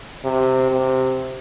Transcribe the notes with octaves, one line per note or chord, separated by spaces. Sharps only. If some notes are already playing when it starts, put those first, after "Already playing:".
C3
C3